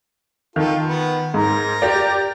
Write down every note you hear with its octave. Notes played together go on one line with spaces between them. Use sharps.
D#3 F4 A4
B3
G#2 A#4 A#5
G4 D5